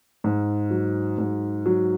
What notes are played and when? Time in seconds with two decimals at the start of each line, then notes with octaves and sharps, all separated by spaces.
0.24 G#2
0.71 F#3
1.18 G#2
1.66 F#3